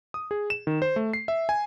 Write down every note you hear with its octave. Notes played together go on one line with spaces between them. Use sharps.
D#6
G#4
E7
D#3
C5
A3
C7
E5
G#5